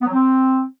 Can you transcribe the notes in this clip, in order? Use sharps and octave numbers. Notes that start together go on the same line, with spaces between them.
B3
F#3
C4